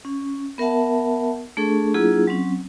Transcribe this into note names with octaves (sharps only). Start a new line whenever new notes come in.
C#4
B3 A#4 E5 F#5 A5
A3 D4 G#4 A4 C#6
F#3 A#3 D4 E4 F4 G#4
F#3 C4 C#4